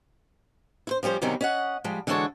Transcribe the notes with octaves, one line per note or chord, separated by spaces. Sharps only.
E4 C5
F3 G3 C#4 G4 C5
E2 C3 D#3 F#3 G3 C#4
C#4 D#5 F#5
F3 G3 G#3
D3 E3 G#3 F#4 A4 C#5